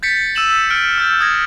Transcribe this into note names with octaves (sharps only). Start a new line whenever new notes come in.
G6 A6 B6 C#7
E6 D#7 E7 F#7
F6 C#7 D7
E6 G6 A6
D#6 G#6 A#6